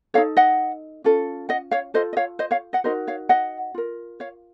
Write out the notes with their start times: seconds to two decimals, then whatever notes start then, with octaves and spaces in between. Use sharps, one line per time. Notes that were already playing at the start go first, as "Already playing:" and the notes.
0.14 D#4 F#4 A4 C#5 F5
0.37 D#5 F#5
1.04 C#4 F4 A4
1.49 D#5 F#5
1.71 C#5 F5
1.94 F4 A4 C5 D#5
2.13 D#5
2.17 C#5 F5
2.39 C5 D#5
2.51 C#5 F5
2.73 D#5 F#5
2.84 D#4 F#4 A#4 C5 D#5
3.07 C#5 F5
3.29 D#5 F#5
3.74 F4 A#4
4.20 C#5 F5